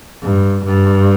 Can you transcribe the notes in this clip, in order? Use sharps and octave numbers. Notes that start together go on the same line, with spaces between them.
G2
G2